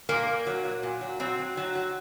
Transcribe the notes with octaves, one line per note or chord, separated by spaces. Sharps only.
A#2 A#3
A#2
F#3
F#3
A#2
F#3
F#3 C4
F#3
F#3
F#3